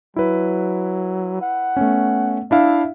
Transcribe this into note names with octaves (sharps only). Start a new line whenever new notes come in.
F#3 E4 B4
F#5
A3 B3 C#4
D4 E4 E5 F5